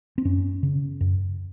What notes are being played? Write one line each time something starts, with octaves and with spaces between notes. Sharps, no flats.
C4
F#2 C#4
C#3
F#2